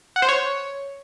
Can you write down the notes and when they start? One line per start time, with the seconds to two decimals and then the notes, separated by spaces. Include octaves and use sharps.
0.16 F#5
0.22 C5
0.28 C#5